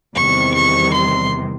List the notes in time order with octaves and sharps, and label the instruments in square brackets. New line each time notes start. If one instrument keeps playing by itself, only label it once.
[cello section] E2 C3 D#3 G3 [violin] C#6
[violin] C#6
C6